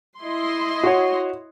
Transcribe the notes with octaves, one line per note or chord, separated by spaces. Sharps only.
E4 D#5 C6
F#4 C#5